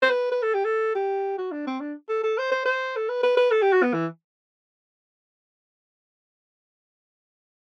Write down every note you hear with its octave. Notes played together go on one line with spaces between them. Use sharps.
C5
B4
B4
A4
G4
A4
G4
F#4
D4
C4
D4
A4
A4
C5
C5
C5
A4
B4
B4
B4
A4
G4
F#4
B3
E3